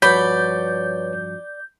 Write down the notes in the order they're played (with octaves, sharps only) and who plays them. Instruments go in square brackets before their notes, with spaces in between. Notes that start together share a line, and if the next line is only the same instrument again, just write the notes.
[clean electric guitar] G2 F3 F#4 [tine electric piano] B4 C#5 [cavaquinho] D5 B5 [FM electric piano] G6